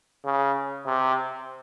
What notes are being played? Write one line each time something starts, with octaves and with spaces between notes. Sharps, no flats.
C#3
C3